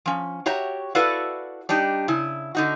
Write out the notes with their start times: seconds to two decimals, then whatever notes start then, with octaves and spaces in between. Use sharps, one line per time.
0.06 F3 C#4
0.46 F#4 G4 C#5 E5 A#5
0.95 E4 F#4 A4 B4 D5 F5
1.69 G3 D4 D#4 G4
2.08 C#3 E4
2.55 D3 D#4 F#4